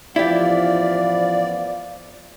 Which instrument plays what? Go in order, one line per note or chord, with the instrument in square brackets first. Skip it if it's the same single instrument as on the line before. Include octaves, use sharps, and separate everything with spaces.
[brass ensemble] A1 B3 F5 [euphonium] F3 [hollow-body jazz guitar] E4 G4 [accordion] D5